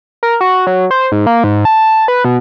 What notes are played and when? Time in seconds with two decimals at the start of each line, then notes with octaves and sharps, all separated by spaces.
0.23 A#4
0.41 F#4
0.67 F#3
0.91 C5
1.12 G#2
1.27 A#3
1.44 G#2
1.65 A5
2.08 B4
2.25 B2